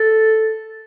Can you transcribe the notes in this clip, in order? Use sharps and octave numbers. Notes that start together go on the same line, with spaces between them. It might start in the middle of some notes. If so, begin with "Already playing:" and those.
Already playing: A4